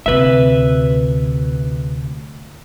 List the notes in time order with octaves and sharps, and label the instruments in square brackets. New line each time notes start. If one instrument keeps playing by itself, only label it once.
[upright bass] D2 C3 [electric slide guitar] B4 E5